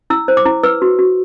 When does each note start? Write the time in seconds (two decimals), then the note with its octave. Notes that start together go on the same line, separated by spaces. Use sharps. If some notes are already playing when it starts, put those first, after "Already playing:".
0.10 E4 E6
0.28 C5
0.37 D6
0.45 E4
0.63 B4 E6
0.82 F#4
0.99 F#4